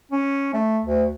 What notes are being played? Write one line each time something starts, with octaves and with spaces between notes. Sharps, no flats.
C#4
A3
D2